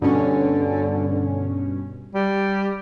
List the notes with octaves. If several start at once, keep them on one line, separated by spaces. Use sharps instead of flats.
G2 B2 D3 C#4
G3